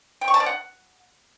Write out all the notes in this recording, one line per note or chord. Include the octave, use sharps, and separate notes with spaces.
G5
C#6
A5
D5
F#5